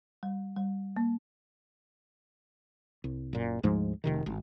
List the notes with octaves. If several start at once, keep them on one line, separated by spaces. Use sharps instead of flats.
G3
G3
A#3
C2
F#1 A#2
D2 G#2 F3 G#3
F1 C3 D#3
G#1